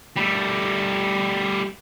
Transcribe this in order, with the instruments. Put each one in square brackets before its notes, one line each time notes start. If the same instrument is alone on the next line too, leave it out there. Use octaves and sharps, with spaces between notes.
[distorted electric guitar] G3 A3